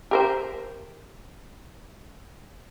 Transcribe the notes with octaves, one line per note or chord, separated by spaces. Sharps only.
G4 A#4 C5